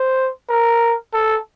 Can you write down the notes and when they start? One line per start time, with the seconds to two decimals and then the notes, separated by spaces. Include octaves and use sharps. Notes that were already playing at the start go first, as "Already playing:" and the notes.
Already playing: C5
0.49 A#4
1.14 A4